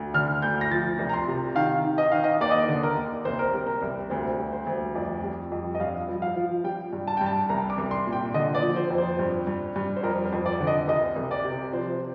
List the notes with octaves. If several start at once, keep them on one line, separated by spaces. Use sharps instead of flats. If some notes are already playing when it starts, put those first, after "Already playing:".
Already playing: D2
D3 F6
D2 G6
A#6
F3 A6
C2
A#5
C6
C3
D#3 F5
D#3
D#5
D#3 F5
D#5
D#2 D5
D#5
D5
D3
A#4
D#2
C2 C5
A#4
G3
A#4
C2
D2 C5
G3
C5
D2
F2 D5
G3
F2
D#5
G2 F5
F3
F5
F3
G3 G5
G2
A5
G2 G5
A5
C2 A#5
D6
C2
C6
A#2
G5
D3 D#5
D5
F3
C5
F2
C5
G2
G2
G2
C5
F2 A#4
C5
F2
D5
D3
D#5
C2 D#5
C2
D5
C3
F3 C5